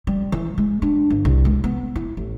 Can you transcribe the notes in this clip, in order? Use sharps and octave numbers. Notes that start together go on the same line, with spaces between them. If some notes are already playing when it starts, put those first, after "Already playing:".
G3
E3
G#3
D4
G1
C2
G#3
B3
E4
A1